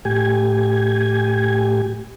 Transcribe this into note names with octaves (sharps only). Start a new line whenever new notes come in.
A2 G4 G#5